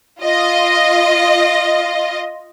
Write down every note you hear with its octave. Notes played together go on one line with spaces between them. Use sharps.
F4 D#5